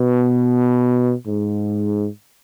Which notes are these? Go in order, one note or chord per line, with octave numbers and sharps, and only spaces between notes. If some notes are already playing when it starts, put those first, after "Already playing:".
Already playing: B2
G#2